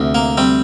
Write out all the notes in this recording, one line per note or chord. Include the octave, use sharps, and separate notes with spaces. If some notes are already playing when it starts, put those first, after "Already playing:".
Already playing: D2 C3
A#3
G3 C4